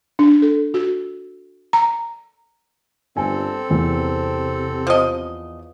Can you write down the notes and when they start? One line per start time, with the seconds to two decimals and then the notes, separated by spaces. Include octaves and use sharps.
0.19 D4
0.42 A4
0.74 F#4
1.73 A#5
3.17 G1 C4 A4 G#5
3.70 E2 C3
4.87 F3 D#5